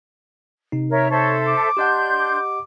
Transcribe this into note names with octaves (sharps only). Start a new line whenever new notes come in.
C3 D#4
A#4 C#5 E5
A4 C5 C#5 E5
D6
D4 G4 D#5 F#5 C6 G6
D6